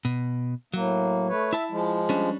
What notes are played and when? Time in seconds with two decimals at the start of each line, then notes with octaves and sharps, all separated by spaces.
0.05 B2
0.74 A2 F#3 A#3
1.28 A3 B4 C#5
1.53 E4 E5 A5
1.70 F3 G#3
2.09 G3 C#4 D4